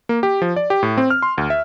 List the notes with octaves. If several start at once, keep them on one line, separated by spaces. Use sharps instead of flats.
A#3
G4
F3
D5
G4
A2
C4
F6
C6
D2
E5